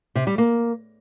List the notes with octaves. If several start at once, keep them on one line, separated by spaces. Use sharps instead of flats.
C3
G3
A#3